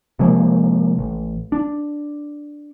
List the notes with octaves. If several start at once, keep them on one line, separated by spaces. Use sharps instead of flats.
C3 F3 G#3 A#3
A1
D4